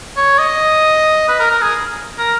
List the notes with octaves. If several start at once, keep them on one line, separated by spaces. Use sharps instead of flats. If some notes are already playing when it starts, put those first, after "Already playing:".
C#5
D#5
B4
A#4
A#4
G#4
A#4